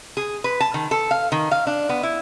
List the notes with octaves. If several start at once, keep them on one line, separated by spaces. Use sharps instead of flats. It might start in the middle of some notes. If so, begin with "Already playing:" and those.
G#4
B4
A5
D#3
A4
F5
D#3
F5
D4
B3
E4